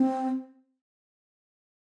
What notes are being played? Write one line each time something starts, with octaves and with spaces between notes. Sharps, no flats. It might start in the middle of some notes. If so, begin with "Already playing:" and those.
Already playing: C4